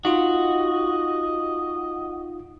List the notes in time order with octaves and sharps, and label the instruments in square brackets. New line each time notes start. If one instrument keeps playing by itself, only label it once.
[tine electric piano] D#4 F4 [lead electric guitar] F#4 [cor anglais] D#5